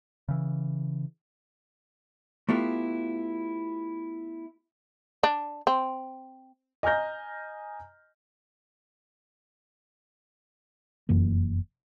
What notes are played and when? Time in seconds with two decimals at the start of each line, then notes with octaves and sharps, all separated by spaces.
0.28 C#3 E3
2.49 A3 B3 E4 F4 G4
5.23 D4
5.67 C4
6.83 D#5 G#5 A#5 F6 G6 A#6
11.09 F1 F#2 E3 A#3